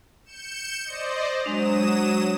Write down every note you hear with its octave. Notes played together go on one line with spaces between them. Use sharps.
G6 C#7 E7
C5 D5 D#5
F#3 G#3 D4 C5 D#6 E7